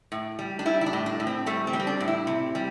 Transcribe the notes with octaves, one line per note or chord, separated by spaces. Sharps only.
A2
G3
D4
G3 E4
E4
D4
A2
D4
A2
C4
G3 A3
C4
G3
C4
D4
A2
E4
C3
G3